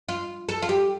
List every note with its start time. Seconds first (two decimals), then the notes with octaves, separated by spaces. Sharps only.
0.09 F4
0.49 A4
0.62 F4
0.69 G4